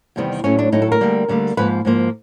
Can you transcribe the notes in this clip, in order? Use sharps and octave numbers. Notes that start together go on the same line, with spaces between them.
E2 C3 D#3 G3 B3
A2 F#3 A3 C#4
D4
A2 F#3 A3 D#4
A4
A#4
D2 D3 G3 A#3
D2 D3 G3 A#3
G#2 F3 A#3 B4
G#2 F3 A#3